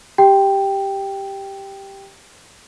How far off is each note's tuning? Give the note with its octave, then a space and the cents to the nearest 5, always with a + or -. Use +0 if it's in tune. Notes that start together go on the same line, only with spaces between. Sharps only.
G4 +0 G5 +0